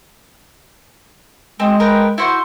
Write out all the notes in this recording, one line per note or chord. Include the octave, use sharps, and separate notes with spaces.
G#3 C4
A#4 B4 G5
E4 F#4 C5